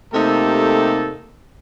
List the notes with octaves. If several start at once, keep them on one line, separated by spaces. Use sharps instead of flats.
C3 A3 A#3 D#4 G4 A4